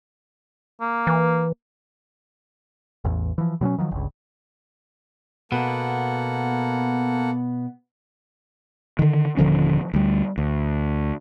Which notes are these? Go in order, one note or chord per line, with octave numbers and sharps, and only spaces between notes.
A#3
E3
A1 E2
E3 F3
B2 F#3 B3 C#4
D#3 F3 F#3
G1 C#2
B2 A#3 B3 A4 F#5
D3 D#3
D#1 D3 F3 C#4
D2 G3
D2